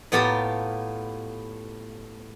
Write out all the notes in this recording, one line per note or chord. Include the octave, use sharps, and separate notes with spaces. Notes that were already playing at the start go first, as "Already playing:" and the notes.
A2 B3 F4 G4 A5 A#5